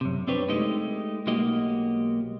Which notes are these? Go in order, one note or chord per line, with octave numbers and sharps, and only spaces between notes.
F#2 C3
C4 D4 G4 B4 C#5
G#3 A3 D#4 G4 D#5
B1 G#3 A#3 F#4 G4 D#5